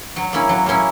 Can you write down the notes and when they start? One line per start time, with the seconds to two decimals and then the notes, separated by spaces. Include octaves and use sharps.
0.16 F#3
0.33 A#3 C#4 E4
0.49 F#3
0.66 A#3 C#4 E4